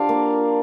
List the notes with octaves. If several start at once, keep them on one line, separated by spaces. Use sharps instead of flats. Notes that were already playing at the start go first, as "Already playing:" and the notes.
Already playing: F3 D4 F4 G4 D5 F5
A#3